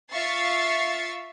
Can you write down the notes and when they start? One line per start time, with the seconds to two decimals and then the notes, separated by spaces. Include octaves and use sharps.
0.11 F4 E5 F5 C#6 A6 C7